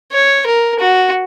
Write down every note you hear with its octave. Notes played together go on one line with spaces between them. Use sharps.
C#5
A#4
F#4